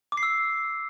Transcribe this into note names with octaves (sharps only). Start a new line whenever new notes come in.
D6
C7
E6